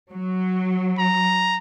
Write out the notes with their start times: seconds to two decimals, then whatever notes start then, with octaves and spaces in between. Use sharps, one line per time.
0.13 F#3
0.98 A#5